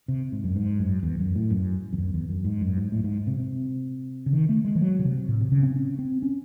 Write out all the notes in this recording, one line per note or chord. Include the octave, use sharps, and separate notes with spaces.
C3
G#2
F#2
G#2
F#2
E2
F#2
A2
F#2
E2
F#2
E2
F#2
G#2
F#2
G#2
A2
G#2
C3
C3
C#3
D#3
A3
G#3
E3
F#3
C#3
C3
A2
C3
C#3
C4
C#4
C4
C#4